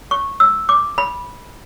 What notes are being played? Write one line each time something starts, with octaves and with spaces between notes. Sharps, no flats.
C#6
E6
D6
B5